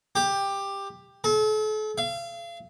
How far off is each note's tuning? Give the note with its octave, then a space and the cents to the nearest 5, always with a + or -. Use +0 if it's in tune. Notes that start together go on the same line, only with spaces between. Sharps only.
G4 +15
A4 -40
F5 -35